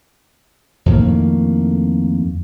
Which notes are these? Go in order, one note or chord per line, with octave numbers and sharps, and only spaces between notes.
F2 A2 D#3 A#3